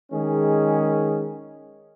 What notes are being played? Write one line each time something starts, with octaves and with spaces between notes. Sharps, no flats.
D#3 G#3 C#4 G#4